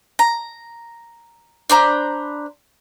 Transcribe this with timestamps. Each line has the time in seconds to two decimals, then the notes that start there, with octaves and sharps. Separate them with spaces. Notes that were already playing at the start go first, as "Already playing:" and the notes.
0.19 A#5
1.70 D4 C5 A#5 B5